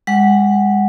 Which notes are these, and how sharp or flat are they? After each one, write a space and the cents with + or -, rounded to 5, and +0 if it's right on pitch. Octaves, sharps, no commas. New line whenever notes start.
G#3 -30 F#5 +5